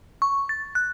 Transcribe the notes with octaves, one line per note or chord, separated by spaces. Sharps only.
C#6
A6
F#6